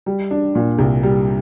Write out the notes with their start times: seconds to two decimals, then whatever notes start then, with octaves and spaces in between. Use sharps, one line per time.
0.06 G3
0.31 D4
0.55 A#2
0.79 C2
1.03 G3